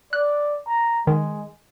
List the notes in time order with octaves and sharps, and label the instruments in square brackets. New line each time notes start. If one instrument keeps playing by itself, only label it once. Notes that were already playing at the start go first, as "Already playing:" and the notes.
[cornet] D5 [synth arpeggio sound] F#6
[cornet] A#5
[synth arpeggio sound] D#3 [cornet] G#3